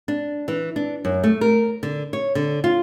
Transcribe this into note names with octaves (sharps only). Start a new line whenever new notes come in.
D4
E3
D4
F#2
A3
A#4
D3
C#5
D3
F4